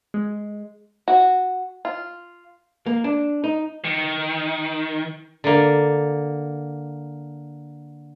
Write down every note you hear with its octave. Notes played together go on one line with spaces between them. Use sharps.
G#3
F#4
F4
A#3
D4
D#4
D#3
D3 A#3